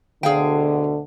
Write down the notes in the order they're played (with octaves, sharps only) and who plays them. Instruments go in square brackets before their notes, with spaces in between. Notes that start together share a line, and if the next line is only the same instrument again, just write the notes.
[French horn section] D2 B2 D3 [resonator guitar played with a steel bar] G#4 F5 G5